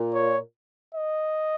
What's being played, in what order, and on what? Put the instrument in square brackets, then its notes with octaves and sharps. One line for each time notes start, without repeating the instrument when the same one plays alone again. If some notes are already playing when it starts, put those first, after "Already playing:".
Already playing: [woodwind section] A#2
[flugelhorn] C#5
D#5